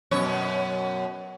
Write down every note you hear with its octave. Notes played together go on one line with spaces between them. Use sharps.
F#2 B2 C#5